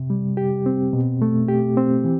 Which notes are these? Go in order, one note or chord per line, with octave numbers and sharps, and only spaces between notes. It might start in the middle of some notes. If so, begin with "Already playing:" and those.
Already playing: C3
G3
G4
C4
B2
A3
G4
C4
E3